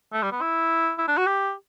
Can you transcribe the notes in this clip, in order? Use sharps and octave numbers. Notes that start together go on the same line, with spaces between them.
A3
G3
B3
E4
E4
D4
F#4
G4